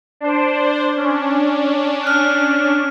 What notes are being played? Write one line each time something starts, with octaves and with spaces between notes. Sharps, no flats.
D4 C5
C#4 D4
F6 F#6